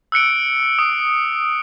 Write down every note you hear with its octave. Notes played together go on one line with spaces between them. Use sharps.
E6 F#6 C#7 D7
D#6